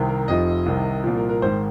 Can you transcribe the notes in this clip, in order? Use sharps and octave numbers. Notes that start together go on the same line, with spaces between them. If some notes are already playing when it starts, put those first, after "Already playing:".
Already playing: C2 C3 D#3
A#4
F1 F2 F3 D#5
C2 C3 D#3
C2 A#2 F3
A#4
A#4
G#1 G#2 D#3 C5